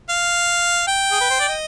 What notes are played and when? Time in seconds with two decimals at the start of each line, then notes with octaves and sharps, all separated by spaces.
0.09 F5
0.87 G5
1.11 G#4
1.21 B4
1.30 C5
1.40 D5
1.49 D#5